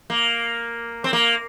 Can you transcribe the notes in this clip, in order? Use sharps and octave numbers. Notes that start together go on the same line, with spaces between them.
A#3
C4
A#3